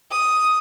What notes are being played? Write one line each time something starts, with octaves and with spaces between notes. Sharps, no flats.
D#6